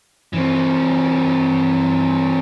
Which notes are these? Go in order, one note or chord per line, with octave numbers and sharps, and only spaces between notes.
E3 C4